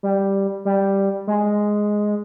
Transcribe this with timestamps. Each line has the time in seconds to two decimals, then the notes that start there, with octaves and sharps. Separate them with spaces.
0.03 G3
0.65 G3
1.27 G#3